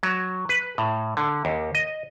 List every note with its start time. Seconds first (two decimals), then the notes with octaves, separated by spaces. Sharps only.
0.03 F#3
0.49 B4
0.78 A2
1.17 D3
1.45 D#2
1.75 D#5